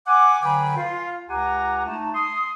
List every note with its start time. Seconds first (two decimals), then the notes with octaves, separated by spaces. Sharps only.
0.07 F#5 G#5 D6
0.42 D3 F#3 B4 G5 G#5 B5
0.77 F4 F5
1.29 C#2 G4 F#5 G#5 A#5
1.86 A3 D#4 A5
2.14 C6 D#6